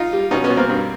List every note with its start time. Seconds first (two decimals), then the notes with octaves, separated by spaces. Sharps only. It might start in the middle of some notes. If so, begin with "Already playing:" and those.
Already playing: D#4 F4
0.13 G3
0.31 B2 C#4 D#4
0.44 B3 C#4
0.50 B2
0.57 A#3 C4
0.69 G2